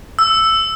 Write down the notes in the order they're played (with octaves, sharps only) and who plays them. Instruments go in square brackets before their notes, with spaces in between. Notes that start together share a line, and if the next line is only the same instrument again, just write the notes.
[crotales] E6